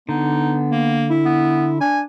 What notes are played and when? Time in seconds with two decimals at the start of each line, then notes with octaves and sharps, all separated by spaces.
0.09 D3 B3 D#4
0.71 A#3
1.10 E4
1.25 B3
1.81 D4 G#5